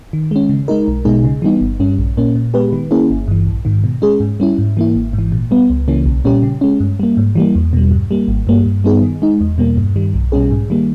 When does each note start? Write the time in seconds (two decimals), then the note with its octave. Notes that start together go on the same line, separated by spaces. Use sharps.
0.13 D#3
0.31 G#3 C#4
0.49 C#3
0.68 G#3 D#4 A#4
0.88 B1
1.05 B2 G#3 D#4 G#4
1.24 C#3
1.42 E3 G3 B3 D#4
1.61 G1
1.80 G2 G3 C#4
1.98 A#1
2.17 A#2 A#3 C#4
2.35 A#2
2.54 G#3 B3 G4 B4
2.73 D#3
2.91 A#3 C#4 E4 G#4
3.10 G1
3.28 G2 E3
3.47 A#1
3.65 G#2 D#3
3.84 B2
4.02 G#3 C#4 G#4
4.20 G#2
4.40 G3 C#4 E4
4.58 G#2
4.77 E3 A#3 E4
4.95 G#1
5.13 G#2
5.19 E3
5.32 A#2
5.51 G3 B3
5.70 C#2
5.88 C#3 E3 A#3 C#4
6.06 B1
6.25 A#2 G3 C#4 G4
6.43 C#3
6.61 G#3 C#4
6.80 G2
7.00 G3 A#3
7.17 G#2
7.35 E3 G3 A#3
7.55 E2
7.73 B2 G3
7.92 G2
8.11 G3 A#3
8.28 G#1
8.47 G2 G3 A#3
8.66 G2
8.84 G3 B3 D#4 G#4
9.02 D#3
9.22 G#3 D#4
9.41 E2
9.58 B2 G3 A#3
9.77 G2
9.96 D#3 G3
10.14 B1
10.32 B2 G3 C#4 G#4
10.51 G#2
10.70 D#3 G3 A#3